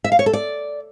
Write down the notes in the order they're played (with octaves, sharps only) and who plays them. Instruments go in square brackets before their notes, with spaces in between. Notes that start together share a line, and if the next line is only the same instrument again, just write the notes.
[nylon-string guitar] E5
F5
C#5
A4
D5